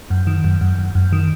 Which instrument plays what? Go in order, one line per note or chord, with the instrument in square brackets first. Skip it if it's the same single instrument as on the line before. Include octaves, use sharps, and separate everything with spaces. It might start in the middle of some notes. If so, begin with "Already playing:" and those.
[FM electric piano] F#2
D#3
F#2
F#2
F#2
F#2
D#3